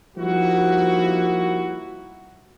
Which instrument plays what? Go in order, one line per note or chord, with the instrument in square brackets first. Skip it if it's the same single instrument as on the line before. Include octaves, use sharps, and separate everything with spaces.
[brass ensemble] F3 G3 A#3 D#4 E4 F#4